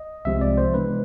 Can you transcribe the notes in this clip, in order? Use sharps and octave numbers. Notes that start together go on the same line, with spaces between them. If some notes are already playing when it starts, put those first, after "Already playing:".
Already playing: D#5
C2 C3 F3 G#3 E5
D5
C5
C3 E3 G#3 B3 D4 B4